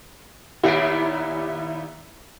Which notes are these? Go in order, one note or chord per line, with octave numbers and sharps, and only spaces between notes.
D#2 A#2 B3 E4 E5 D7